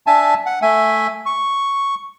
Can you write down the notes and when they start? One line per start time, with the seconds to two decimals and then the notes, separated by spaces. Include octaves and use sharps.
0.07 D4 E5 G#5 A5
0.46 F#5
0.62 A3 E5 G#5
1.26 C#6